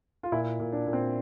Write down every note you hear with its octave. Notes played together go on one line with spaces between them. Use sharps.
F4
A#2 E4
A#2
D4
A#2
C4